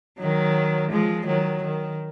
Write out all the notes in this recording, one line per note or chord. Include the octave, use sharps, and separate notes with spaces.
D#3 F#3
F3 G#3
D#3 F#3
D#3